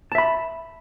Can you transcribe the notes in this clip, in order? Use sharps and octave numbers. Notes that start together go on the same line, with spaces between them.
E5 A5 B5